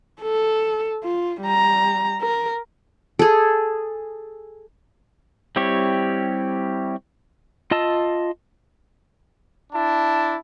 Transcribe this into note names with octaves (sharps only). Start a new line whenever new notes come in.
A4
F4
G3 A#5
A#4
G#4 A4
G3 C4 E4 G4 C#5
F4 D#5 A5 E6
D4 E4 A5